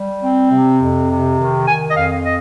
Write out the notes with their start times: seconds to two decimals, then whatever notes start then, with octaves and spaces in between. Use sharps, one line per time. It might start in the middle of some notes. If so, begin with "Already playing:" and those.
Already playing: G3
0.23 C4
0.51 C3
0.81 F2
1.09 C3
1.38 D#3
1.67 D#3 G#5
1.91 D#5
1.96 F2 F5
2.25 D#5